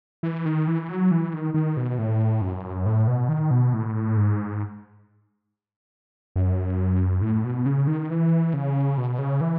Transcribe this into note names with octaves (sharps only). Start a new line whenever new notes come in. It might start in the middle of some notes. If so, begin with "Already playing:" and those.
E3
D#3
E3
F#3
E3
D#3
D#3
B2
A2
F#2
A2
B2
D#3
B2
A2
G#2
F#2
A2
B2
C#3
D#3
E3
C#3
B2
C#3
E3